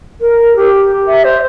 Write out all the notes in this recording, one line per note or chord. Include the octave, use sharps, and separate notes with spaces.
A#4
G4
E5
C5